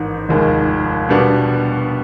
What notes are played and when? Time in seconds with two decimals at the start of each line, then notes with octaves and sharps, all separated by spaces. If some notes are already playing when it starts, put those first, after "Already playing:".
Already playing: A1 G#2 D#3
0.29 F1 D#2 D#3 G#3
1.09 B2 G3 B3 D4